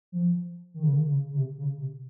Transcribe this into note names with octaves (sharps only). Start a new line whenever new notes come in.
F3
D#3
C#3
D#3
C#3
C#3
C3
C#3
C3